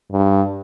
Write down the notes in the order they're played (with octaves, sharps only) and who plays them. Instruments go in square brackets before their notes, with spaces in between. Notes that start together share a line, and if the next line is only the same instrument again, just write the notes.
[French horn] G2